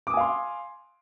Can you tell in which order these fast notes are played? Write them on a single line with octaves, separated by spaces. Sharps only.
D6 D#6 G#5 F5 C6